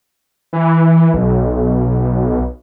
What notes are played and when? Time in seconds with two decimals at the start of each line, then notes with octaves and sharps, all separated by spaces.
0.53 E3
1.14 B1